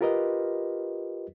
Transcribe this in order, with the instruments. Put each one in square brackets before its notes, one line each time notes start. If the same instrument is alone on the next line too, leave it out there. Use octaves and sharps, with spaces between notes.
[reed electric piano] F4 G4 A#4 B4 D#5